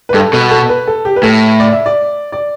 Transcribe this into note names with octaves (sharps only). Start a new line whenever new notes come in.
B4
G2 A4
B2 A4
A4
B4
A4
G4
B4
A2 A4
D5
E5
D5
D5